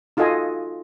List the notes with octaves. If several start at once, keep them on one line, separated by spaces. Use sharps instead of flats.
D#4 F4 F#4 A4 D#5 G#5